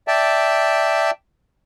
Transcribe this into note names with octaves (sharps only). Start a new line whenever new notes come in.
D5 E5 G5 A5